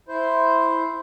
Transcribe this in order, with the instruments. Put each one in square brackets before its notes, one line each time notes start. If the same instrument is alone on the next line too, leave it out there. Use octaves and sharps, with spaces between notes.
[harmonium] E4 C5